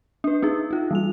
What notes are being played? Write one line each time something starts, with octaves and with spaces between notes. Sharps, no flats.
D4 B4
D4 D#4 G#4
D#4 F4
E3 G3 F7